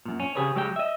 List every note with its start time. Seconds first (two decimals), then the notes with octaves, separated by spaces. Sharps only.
0.05 F#2 A#2
0.20 C#4
0.35 C#3 G4 G#4 B4 C#5
0.55 C#2 F#3 G#3 G4 C#5 G5
0.76 D#5 E5